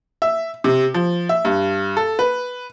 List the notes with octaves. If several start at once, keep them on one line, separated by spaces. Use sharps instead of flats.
E5
C3
F3
E5
G2
A4
B4